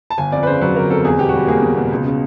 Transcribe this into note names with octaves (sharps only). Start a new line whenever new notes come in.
A5
G1 G#5
F2 D5
B4
C#3 C5
F#3 B4
G1 A#4
F2 A4
E2 G#4
B2 G4
F#4
G3 G4
A#3 G#4
E2
B2
C#2
C#3